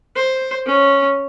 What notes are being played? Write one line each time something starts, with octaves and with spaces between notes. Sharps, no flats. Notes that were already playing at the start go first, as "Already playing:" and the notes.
C5
C#4